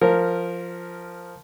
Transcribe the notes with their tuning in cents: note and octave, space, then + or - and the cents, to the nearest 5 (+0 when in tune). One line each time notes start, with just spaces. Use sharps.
F3 +0 A#4 -10